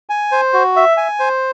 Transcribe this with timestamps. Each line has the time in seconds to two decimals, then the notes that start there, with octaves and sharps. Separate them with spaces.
0.09 G#5
0.32 C5
0.53 F#4
0.76 E5
0.97 G#5
1.19 C5